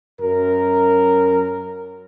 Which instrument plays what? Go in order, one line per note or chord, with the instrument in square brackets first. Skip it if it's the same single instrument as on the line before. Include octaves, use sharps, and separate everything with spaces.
[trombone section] F#2 A#4